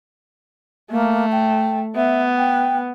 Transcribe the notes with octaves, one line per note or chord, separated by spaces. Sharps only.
A3 A#3
G5
B3 E5
G5